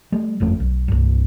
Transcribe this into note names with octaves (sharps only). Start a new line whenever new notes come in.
G3 A3
G1 F2 A3 C#4
B1
C2 G2